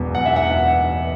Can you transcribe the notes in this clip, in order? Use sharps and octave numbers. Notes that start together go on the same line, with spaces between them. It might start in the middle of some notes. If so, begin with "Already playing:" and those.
Already playing: E1 E2 B2 F#3
F#5
E5
F#5